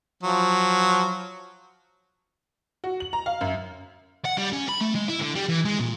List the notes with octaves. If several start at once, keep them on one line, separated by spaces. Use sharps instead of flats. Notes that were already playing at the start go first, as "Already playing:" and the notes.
F3 F#3
F#4
F#7
A#5
F5
F#2
F#5
G3
C#4
B5
A3
G#3
E4
D3
G3
E3
G#3
A#2